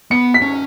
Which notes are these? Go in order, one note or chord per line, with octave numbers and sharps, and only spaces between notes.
B3 C#7
B6
C#4